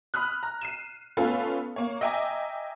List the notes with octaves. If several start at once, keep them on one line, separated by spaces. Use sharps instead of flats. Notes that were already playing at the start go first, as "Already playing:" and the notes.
B5 D#6 F6 F#6
A#5
C7 D#7 E7
A3 B3 C#4 F4 A4 B4
A#3 C#5
D#5 E5 G5 G#5 A#5 D6